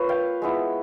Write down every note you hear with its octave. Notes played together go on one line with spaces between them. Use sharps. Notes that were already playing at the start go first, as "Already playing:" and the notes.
Already playing: A#3 F4 B4 C#5
F5 G5
G#3 B3 E4